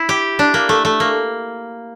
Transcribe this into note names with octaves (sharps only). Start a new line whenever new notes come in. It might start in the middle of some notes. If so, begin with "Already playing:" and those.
Already playing: E4
G4
D4
A#3
A3
A3
A#3